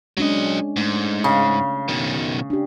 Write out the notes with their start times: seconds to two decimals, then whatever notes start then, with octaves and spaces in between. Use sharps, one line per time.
0.17 F#3 G#3 C#4 D4 D#5
0.76 G#2 A3
1.24 C#3 F5
1.89 B2 D#3
2.50 D4 G4